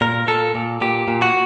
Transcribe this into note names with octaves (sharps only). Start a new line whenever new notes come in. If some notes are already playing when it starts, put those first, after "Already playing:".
A#2 A#4
A#2 A4
A#2
A#2 G4
A#2
F#4